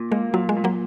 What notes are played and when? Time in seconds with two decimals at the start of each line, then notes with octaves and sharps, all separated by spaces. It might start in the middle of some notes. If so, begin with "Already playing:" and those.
Already playing: A#2
0.11 G#3 A#3
0.34 A#2 F#3
0.49 G#3
0.57 A#2
0.64 F#3 A#3